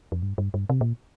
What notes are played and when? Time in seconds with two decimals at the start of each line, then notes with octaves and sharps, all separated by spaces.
0.12 F2
0.23 G2
0.38 G2
0.54 G2
0.70 C3
0.81 A#2